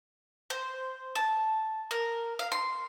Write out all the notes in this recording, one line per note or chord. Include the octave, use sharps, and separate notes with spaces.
C5
A5
A#4
F5
C6